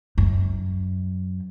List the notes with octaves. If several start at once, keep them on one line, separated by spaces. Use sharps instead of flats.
F#2